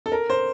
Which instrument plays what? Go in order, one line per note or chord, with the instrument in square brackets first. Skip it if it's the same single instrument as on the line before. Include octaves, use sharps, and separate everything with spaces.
[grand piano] A4
A#4
C5